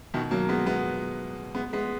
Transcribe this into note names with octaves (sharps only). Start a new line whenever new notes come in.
B2 D#3
F#3 A#3
G#3 B3
G#3 B3
G#3 B3
G#3 B3